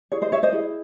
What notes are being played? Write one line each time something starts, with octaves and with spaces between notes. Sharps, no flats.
E4 G#4 C#5
C5 D#5
C#5 E5
C5 D#5
E4 G#4